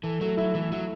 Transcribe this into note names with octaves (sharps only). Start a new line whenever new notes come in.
E3 A4
F#3 A3
F#3 E4
E3 A3
F#3 E4